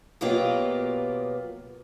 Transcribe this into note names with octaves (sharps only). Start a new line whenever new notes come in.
B2 F#3 A#3 B3 F4 G4